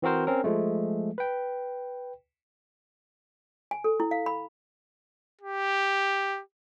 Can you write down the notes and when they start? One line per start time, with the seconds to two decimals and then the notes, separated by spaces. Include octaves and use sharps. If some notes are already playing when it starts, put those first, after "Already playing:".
0.02 E3 C4 F#4 A#4 C5
0.27 C4 C#4 A#4
0.44 F3 G#3 A3
1.18 B4 G5
3.71 G#5
3.84 A4
4.00 E4
4.11 F5
4.26 B5
5.41 G4